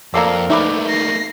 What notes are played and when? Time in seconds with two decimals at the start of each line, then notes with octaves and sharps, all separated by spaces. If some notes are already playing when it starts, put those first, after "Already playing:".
0.14 F2 A#3 A4 A#4 D5 E6 C7
0.50 A3 A#3 D#4 B4 D5 E5
0.89 A#6 C7